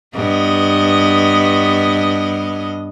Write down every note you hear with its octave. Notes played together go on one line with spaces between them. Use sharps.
G2 B3 D#5